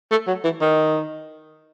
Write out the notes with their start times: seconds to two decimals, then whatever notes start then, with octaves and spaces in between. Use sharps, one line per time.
0.11 A3
0.27 F#3
0.44 E3
0.61 D#3